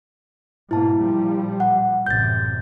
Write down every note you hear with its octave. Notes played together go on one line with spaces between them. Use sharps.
G#2 B2 A#3 E4 A5
A#2 F3 G3
F#5
A1 F#2 C3 G6 A6